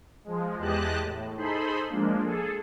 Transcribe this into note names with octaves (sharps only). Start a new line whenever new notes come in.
F3 G#3
E2 G#3 G4 D#5 A5 F#6
A2
D#4 G#4 A4 C5 B5 C6
F3 G#3 A#3 D4
G#4 A4